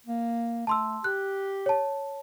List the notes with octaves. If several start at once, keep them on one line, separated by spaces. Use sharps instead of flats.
A#3
A3 A5 C6 E6
G4 F#6
C#5 A5